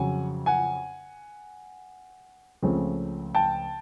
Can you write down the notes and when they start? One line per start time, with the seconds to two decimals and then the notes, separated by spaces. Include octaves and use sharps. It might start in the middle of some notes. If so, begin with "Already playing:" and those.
Already playing: F2 C#3 F#3 F#5 G#5
0.46 F#5 G#5
2.62 C#2 C#3 F3 A3 C4
3.35 G5 A5